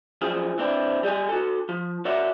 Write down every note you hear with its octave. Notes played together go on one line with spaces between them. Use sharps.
F#2 F3 G#4
E3 C4 D4 E4
G3 G4 D#5 G#5
F#4 A4
F3
F#4 A#4 C#5 D5 E5 F#5